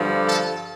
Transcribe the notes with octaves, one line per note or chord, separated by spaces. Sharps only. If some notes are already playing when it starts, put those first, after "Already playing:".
Already playing: G2 D3 F3
A4